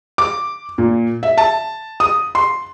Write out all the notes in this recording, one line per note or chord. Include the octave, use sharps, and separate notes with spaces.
D6
A#2
E5
A5
D#6
C6